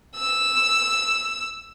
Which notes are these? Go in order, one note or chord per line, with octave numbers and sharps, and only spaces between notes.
E6